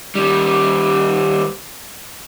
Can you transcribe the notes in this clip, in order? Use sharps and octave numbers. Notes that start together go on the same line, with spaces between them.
D#2 G3